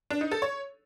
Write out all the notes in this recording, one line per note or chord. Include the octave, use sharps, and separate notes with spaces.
D4
D#4
A4
C#5